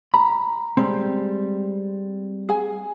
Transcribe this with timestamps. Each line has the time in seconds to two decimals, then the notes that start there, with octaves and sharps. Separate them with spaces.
0.14 A#5 B5
0.77 G3 G#3 C4
2.49 G#4 G#5